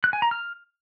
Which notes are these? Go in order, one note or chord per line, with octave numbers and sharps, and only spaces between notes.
F#6
G#5
A#5
F6